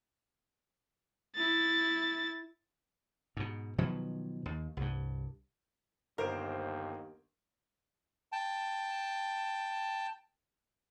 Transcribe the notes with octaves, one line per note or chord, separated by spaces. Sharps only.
E4 A6
G#2 B2
B2 D#3 F3 F#3
D#2
C2 G2
G1 D#2 A#4 C5 D7
G5 A5